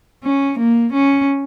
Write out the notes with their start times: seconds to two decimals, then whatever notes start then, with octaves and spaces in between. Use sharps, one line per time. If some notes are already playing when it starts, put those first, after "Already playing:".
0.24 C#4
0.59 A#3
0.93 C#4